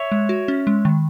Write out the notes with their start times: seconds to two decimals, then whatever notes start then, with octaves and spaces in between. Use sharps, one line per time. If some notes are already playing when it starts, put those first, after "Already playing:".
Already playing: C#5 E5
0.12 G#3
0.29 F#4
0.48 C#4
0.67 G#3
0.85 D#3